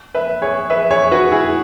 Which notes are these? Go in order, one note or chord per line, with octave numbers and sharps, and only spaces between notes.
B4 E5
G#4 C#5
B4 E5
G#4 C#5
F#4 B4
E4 G#4